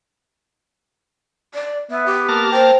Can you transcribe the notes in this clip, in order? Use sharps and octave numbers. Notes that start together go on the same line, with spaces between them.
D5
B3 E5
G4
A#3 A5 F6
C5 G5